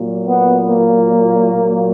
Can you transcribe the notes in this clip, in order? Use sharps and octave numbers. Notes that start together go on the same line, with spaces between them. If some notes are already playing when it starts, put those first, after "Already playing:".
Already playing: A#2 F#3
B3
A#3
A#2 F#3